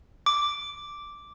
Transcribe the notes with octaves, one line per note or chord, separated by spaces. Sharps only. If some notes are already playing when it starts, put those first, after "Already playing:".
D6